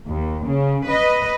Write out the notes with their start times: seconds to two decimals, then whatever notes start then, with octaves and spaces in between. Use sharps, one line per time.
0.11 D#2
0.48 C#3
0.88 B4 D#5